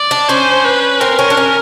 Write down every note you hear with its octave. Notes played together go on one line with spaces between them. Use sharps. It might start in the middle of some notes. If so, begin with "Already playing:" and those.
Already playing: D5
D4
C#4 C5
B4
C4 A#4
C#4
D4
C#4